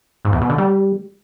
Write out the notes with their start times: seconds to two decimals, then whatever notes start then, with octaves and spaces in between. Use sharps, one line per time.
0.25 G#2
0.33 E2
0.41 B2
0.50 D3
0.58 G3